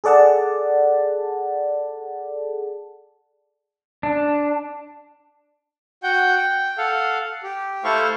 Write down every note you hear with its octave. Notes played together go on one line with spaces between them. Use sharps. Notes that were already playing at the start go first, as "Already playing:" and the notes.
G#4 A4 D5 F#5 A5
D4
F#4 F#5 G5 G6
G5
A4 F5 F#5
G4
A3 E4 A4 C5 F5 C#6